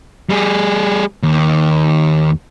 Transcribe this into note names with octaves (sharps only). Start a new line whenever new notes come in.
G3 G#4
D#2